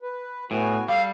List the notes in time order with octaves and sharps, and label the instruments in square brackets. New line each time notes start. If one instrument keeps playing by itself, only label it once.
[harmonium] B4
[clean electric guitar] A2 [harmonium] B3 F#4 G#5
[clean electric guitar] G3 [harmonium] A4 [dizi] F5